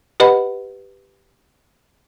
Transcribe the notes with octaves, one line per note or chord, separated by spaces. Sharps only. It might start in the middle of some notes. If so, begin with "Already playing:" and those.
G4 B4 D#5 F#5 B5